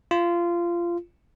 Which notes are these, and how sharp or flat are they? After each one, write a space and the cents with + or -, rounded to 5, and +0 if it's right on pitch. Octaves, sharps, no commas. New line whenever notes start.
F4 -20